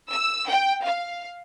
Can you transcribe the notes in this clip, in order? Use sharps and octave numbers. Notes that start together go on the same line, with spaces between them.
E6
G5
F5